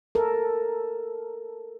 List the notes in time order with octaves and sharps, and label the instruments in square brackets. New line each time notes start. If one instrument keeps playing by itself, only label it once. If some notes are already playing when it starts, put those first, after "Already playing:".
[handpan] A4 A#4